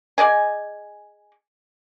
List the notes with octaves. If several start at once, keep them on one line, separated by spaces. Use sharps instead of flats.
G#4 D5 D#5 G#5